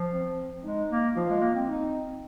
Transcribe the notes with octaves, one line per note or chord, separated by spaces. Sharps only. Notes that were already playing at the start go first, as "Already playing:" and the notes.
Already playing: F3
C4
G#3 D#4
A#3
F3 F4
G#3
A#3
C4
D#4